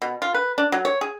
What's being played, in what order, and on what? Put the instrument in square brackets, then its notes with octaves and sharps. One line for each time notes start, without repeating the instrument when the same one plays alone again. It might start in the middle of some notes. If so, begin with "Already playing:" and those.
[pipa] B2
F4
B4
D4
F#3
C#5
G#4